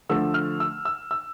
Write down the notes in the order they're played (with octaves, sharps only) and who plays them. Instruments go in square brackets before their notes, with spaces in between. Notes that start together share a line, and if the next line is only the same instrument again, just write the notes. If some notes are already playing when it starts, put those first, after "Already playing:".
[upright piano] D3 F3 A3 E6
F6
E6
E6
E6